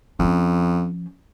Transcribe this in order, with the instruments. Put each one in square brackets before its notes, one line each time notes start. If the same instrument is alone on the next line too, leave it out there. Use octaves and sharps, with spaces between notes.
[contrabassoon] F2 [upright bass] F3 C#4